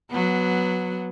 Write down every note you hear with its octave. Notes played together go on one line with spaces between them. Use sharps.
F#3 B3